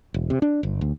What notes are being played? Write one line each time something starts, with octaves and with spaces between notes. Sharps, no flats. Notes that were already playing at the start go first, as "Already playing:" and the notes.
E1
C3
D4
G1
D2